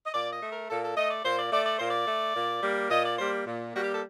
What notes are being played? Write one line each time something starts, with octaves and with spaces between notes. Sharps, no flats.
D#5
A#2 D5
D#5
A3
A#4
A#2 A4
A4
A3 D#5
D5
A#2 C5
D5
A3 D5
D5
A#2 C5
D5
A3
A#2
G3 A#3
A#2 D#5
D5
G3 A#3 C5
A#2
G3 A#3 F#4
G4
A4